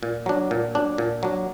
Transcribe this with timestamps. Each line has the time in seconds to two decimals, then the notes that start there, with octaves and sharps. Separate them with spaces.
0.03 A#2
0.26 F#3 D4
0.51 A#2
0.75 F#3 D4
0.98 A#2
1.23 F#3 D4